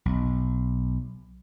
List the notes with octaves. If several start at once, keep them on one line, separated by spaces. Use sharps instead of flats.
B1